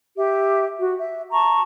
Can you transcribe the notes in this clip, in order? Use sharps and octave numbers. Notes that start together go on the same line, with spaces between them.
G4 E5
F#4
E5
A5 A#5 C#6